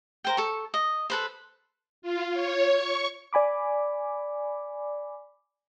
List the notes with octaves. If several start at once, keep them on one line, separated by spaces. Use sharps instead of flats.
A#4 C5 G5
A4 C#6
D#5
A4 B4 C5
F4
C#5
C#6
D5 G#5 B5 D6